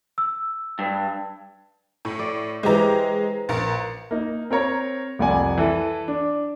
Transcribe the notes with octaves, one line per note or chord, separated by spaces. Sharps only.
E6
G2
A2
D5
E3 G#3 G4 C5 A#5
A#1 A#4
A#3 D#4
C4 A#4 C#5 A#5
C2 F2 D5 F#5 G#5
E3 E4 A4
D4